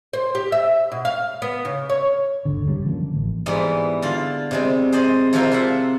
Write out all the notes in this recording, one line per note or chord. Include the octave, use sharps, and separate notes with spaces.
C5
G4
E5
B2
F5
B3
C#3
C#5
G1 D#2 D3
F#1 F#2 G3 C#4
D3 F3 A3 A#3
A1
G#2 E3 G3 B3
D3 F4
C3 G3 G#3
G#4 C5 D5 D#5
C3 F3 A#3 E4 F4 C5
F4 E5 F#5